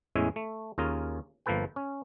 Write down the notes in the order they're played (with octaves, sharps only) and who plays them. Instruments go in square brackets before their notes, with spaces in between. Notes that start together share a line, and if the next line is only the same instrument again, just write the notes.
[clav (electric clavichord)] E2 A2 G#3 C#4 E5 G#5
A3
D#2 C#4 F4 G#4 A#4
G1 F3 A#3 A4 B4 G5
C#4